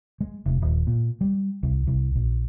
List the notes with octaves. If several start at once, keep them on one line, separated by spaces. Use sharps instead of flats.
G#3
F1
D#1
A#2
G3
C2
C2
A#1